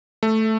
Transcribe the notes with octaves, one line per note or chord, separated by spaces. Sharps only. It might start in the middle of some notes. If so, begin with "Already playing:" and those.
A3